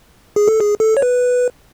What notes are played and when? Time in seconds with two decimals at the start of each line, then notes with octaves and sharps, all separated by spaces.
0.36 G#4
0.48 A4
0.60 G#4
0.80 A4
0.97 C#5
1.02 B4